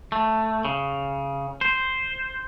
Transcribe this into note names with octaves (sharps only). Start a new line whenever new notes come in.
A3
C#3
C5